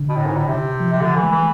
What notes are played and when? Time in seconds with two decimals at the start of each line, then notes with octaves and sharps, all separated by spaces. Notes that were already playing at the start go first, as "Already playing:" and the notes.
Already playing: D3
0.09 B2
0.16 A2
0.26 G#2
0.37 A2
0.47 C3
0.80 F3
0.93 C3
1.01 D3 F3
1.16 E3
1.23 G#3
1.31 E3